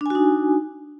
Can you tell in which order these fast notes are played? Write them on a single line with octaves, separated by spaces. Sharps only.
D4 G#5 F#4 D#4